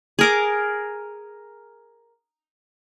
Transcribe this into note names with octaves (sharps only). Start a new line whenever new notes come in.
G#4 A#4 D6